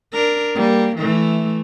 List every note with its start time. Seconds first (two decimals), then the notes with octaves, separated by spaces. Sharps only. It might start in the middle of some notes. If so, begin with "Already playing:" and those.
0.12 D4 A#4
0.55 G3 A#3
0.96 E3 A3